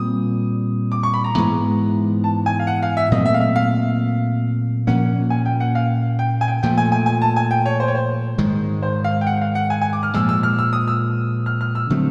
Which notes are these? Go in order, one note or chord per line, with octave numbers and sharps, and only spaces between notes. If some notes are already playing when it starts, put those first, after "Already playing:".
Already playing: A#2 G3 C4 D#6
D6
C#6
B5
A#5
G#2 E3 G#3 B3
A5
G#5
F5
F#5
F5
E5
A#2 F#3 A3 C4 D#5
E5
F5
E5
F5
A#2 F3 A#3 C#4 F#5
G#5
G5
F#5
F5
G5
G#5
G5
A#2 F3 A3 G5
G#5
G#5
G#5
A5
G#5
G5
C#5
C5
C#5
C5
G#2 D#3 G#3
C5
F5
G5
F#5
F5
F#5
G#5
G#5
D6
F6
A#2 F3 G#3 E6
E6
F6
E6
D#6
E6
F6
F6
E6
D3 F#3 A3 C4